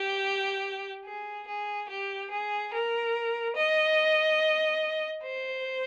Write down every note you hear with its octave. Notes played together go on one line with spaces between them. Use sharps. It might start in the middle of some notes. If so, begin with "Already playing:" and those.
Already playing: G4
G#4
G#4
G4
G#4
A#4
D#5
C5